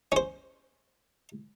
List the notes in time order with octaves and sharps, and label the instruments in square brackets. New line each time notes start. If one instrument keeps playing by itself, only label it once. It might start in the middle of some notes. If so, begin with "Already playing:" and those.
[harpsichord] C#4 C5